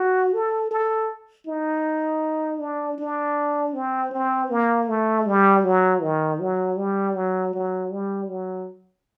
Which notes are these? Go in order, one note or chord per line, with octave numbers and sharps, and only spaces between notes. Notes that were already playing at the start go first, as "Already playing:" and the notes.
Already playing: F#4
A4
A4
D#4
D4
D4
C4
C4
A#3
A3
G3
F#3
D#3
F#3
G3
F#3
F#3
G3
F#3